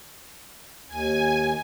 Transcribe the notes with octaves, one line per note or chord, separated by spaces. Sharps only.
D#2 G#5